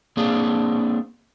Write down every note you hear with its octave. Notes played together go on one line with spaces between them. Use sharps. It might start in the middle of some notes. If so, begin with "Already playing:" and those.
A#3 C4 D4 G#4